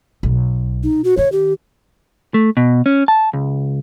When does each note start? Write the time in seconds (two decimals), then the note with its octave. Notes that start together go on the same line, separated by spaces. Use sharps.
0.23 B1
0.83 D#4
1.04 F#4
1.17 D#3 C#5
1.32 G4
2.34 A3
2.57 B2
2.86 C#4
3.08 A5
3.33 C#2